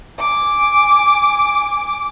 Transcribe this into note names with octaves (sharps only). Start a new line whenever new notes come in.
G#5 D6